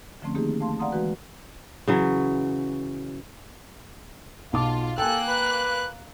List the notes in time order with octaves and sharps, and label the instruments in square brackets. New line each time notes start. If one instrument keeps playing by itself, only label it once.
[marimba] D3 F3 A3 C4 C#4
D#3 A#3 D#4 G4 G#4
A3 F5 A5 C6
D5 F5 F#5 A#5 C6 D#6
E3 G#3 F#4 B4
[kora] C#3 E3 F#3
[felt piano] B1 A5 D6 [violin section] F4
[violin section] A#3 F#6 [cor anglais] A4 [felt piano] G5 G#5
[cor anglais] B4